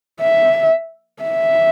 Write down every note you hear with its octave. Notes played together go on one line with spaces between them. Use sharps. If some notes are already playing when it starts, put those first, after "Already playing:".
E5
E5